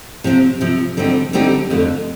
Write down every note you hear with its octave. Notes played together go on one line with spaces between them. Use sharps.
C3 F3 C4
C3 F3 C4
D3 G3 C4 D#4 G4
D3 G3 C4 D#4 G4
F2 D3 A3